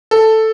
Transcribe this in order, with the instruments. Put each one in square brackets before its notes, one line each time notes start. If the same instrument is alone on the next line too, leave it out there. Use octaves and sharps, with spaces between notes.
[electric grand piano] A4